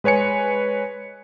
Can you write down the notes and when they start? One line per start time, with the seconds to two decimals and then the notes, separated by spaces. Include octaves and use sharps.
0.04 G#3 B4 C#5 G#5 C#7